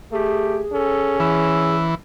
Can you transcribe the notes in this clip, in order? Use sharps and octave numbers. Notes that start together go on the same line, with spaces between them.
A3 G4 G#4
C#4 A4
E3 E6